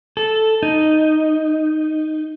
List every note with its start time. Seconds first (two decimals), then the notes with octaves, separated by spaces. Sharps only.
0.17 A4
0.63 D#4